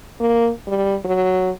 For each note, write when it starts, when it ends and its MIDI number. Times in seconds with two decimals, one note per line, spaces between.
0.21 0.50 58
0.67 0.96 55
1.05 1.51 54